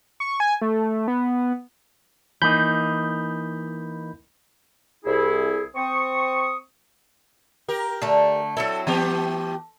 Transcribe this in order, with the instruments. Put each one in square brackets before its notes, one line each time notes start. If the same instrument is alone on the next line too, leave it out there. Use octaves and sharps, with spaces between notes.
[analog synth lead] C#6
G#5
A3
B3
[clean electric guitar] E3 A#3 D#4 [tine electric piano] B5 G6
[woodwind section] C2 E4 G#4
C4 C#6 D#6
[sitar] G4 A#4
[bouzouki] D3 A3
[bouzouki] F#3 C4 E4 [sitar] A4
[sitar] E3 B3 G4 [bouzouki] A3